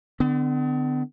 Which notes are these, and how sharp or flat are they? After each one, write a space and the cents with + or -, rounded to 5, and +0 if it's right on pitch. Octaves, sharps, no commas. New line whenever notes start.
D3 +20 B3 +45